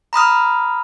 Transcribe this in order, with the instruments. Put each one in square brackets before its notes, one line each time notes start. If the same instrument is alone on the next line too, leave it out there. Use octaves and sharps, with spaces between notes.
[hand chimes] A#5 B5 D#6 F6